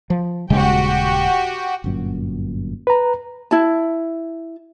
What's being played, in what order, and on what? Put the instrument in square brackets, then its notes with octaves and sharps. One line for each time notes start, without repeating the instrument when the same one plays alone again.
[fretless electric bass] F3
[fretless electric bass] D#1 C#3 G#3 [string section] F#4 G4
[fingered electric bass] G1 F#2 A#2
[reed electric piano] B4 A#5
[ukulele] E4 A5